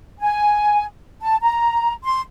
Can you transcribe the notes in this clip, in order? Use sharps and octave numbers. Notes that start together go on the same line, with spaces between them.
G#5
A5
A#5
C6